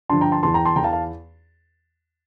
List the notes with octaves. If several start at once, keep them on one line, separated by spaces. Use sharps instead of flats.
G2 D3 F3 A5 C6
G5 A#5
A5 C6
E2 E3 A5 C6
G5 A#5
A5 C6
E2 E3 F5 G5 A5 A#5
F5 A5